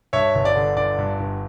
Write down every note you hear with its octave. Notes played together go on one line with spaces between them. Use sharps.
G2 C#5 E5
G1
D5
D3
G1 D5
G2
G1